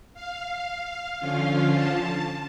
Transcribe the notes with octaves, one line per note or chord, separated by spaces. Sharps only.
F5
D3 F3 C#4 F4 F5
A5